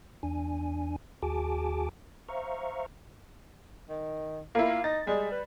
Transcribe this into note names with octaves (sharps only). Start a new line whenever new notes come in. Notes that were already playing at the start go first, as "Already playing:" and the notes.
E2 D4 G#5
D#2 F#4 G#4 G#5 A5 D6
C5 E5 F5 A#5 C#6
D#3
A#3 E4 F4
D#4 A6
G3 G#3
B4